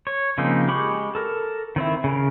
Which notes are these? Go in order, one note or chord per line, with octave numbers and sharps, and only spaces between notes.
C#5
C#3 F3 A#3 C4 D#4
G#3 G4 B5 C#6
A4 A#4
D#3 C4 E4
C#3 A#4